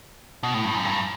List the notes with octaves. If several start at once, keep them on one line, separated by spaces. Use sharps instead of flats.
B2
A2
G2
F#2
G2